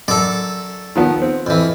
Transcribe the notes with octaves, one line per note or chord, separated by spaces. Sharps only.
F#2 A4 D5
D#3 F3 B3
C4
F2 E3